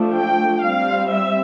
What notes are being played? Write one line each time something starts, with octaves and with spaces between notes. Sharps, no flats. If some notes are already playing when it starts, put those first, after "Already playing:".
Already playing: F3 A3 D4
G5
G3 C4 F5
E5